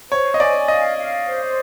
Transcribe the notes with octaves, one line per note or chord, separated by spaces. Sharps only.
C5 C#5
D#5
D5 G#5
D#5 F5
F5
C5